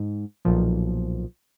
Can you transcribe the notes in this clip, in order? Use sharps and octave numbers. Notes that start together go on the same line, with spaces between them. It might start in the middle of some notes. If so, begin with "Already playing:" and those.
Already playing: G#2
B1 A#2 F3